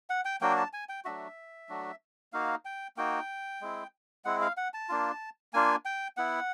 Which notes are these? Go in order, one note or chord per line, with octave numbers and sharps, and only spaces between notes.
F#5
G5
F#3 A#3 D4 F#4 G5
A5
G#5
G5
F#3 A3 D4 F#4 E5
F#3 A3 D4 F#4
A#3 D#4 F#4 F5
G5
A#3 D#4 F#4 G5
G#3 C4 E4
G#3 C4 E4 F#5
F5
F#5
A5
A#3 D4 F4
A#3 D4 F4 G#5
G5
B3 E4 F#5